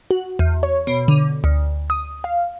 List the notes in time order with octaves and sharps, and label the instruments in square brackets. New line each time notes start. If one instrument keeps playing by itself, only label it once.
[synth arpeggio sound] F#4
E2
C#5
B2
D3
D2
D#6
F5